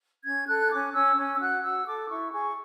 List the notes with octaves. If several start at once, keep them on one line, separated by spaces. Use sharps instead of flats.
C#4 G#6
A4 F#6
C#4 D6
C#4 E6
C#4
E6
F#4 F#6
F#4 E6
A4 D6
E4 C#6
G#4 C#6